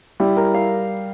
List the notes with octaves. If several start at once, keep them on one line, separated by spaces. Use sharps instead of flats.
G3 E4
A#4
F5